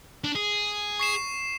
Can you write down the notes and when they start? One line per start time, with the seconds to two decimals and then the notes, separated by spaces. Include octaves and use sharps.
0.24 D4
0.35 G#4
1.00 C#6 C7 E7